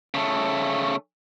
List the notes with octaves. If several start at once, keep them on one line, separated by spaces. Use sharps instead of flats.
C#3 A3